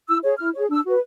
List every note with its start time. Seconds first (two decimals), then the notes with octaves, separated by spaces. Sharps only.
0.08 E4 E6
0.24 G#4 C#5
0.39 E4 F6
0.54 G#4 C#5
0.69 D4 E6
0.84 F#4 B4